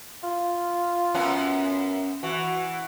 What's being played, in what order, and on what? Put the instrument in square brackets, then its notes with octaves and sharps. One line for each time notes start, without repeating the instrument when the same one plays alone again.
[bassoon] F4
[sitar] F#2 B3 C#4
[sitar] E3 [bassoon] F#4